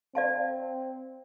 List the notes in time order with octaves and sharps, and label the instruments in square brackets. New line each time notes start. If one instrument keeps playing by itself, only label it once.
[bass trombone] C4 [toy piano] D5 F5 A5